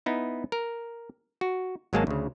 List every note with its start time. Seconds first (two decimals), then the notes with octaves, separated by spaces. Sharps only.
0.06 B3 D#4 E4
0.52 A#4
1.41 F#4
1.93 G#1 F#3 G#3 A#3 G#4 A5
2.07 D2 C#3